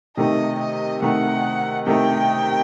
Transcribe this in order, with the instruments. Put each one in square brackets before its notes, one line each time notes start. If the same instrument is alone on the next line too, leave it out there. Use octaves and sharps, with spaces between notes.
[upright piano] C3 D#3 A3 D#4 [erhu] D#5
[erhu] D#5
[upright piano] C3 D#3 A3 D#4 [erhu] F#5
[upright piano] C3 D#3 A3 D#4 [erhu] G5